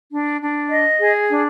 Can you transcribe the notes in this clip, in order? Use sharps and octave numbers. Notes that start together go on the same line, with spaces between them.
D4
D4
D#5
G#4
D4